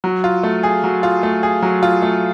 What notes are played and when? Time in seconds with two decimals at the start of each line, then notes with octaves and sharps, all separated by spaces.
0.04 F#3
0.24 F4
0.43 A3
0.63 G#4
0.84 F#3
1.03 F4
1.23 A3
1.43 G#4
1.62 F#3
1.83 F4
2.02 A3